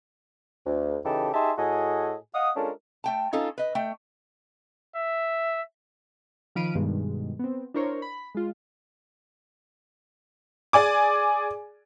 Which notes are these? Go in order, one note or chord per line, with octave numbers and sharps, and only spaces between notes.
D2
C#3 E3 D#4 G4 A4 A5
D#4 G4 G#4 E5 A5 C6
A2 F#4 G#4 A4 D#5 G#5
D#5 F5 F#5 D#6
G#3 C#4 D4 F4 A4 A#4
A3 G5 A5
C#4 D#4 F4 A4
B4 D#5
A3 G5
E5
D#3 F3 F5 B5 D7 D#7
G2 B2 D#3 G#3
B3 C4
D4 E4 A#4 C5 C#5
B5
G#3 F4
G#4 D5 G#5 D6